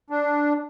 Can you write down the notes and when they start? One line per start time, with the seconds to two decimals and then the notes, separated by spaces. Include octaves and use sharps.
0.10 D4